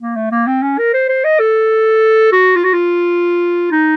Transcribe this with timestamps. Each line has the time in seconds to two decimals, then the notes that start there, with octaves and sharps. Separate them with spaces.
0.01 A#3
0.16 A3
0.31 A#3
0.47 C4
0.62 C#4
0.78 A#4
0.94 C5
1.09 C5
1.24 D#5
1.40 A4
2.32 F#4
2.56 F4
2.64 F#4
2.73 F4
3.71 D#4